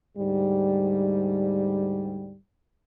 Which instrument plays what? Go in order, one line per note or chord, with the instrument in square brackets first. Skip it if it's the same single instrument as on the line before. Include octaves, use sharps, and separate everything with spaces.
[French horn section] D2 G#2 G3